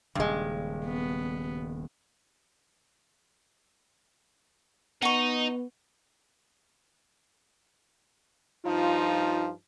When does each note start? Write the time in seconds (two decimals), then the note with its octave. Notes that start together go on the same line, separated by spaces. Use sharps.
0.15 D#1 G2 C#3 G#3
0.85 B3
5.02 B3 D#4 F#5 C#6
8.65 G2 F3 D#4 F4